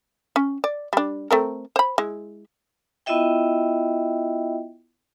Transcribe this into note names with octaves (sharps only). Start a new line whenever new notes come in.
C#4
D5
G3 D4
A3 C4 A#4
C5 B5
G#3 E4
B3 E4 F4 D#5 E5 G5